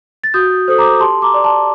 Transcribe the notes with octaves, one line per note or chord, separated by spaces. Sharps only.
A6
F#4 D#6 G6
A4 C5 D#6
A#5 D6
G4 A5 C6
A#5 D6
D5
A5 C6